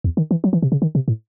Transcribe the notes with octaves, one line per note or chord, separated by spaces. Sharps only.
E2
D#3
E3
F#3
E3
C3
C#3
D#3
C3
A2